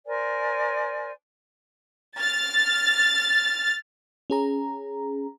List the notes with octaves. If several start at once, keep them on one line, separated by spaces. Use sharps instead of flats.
A#4 C5 D5 G#5
F6 A6
C#4 G#4 A#5